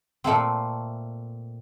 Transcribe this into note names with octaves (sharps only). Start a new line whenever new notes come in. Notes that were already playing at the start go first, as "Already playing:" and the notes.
A#2 A3 A#3 C4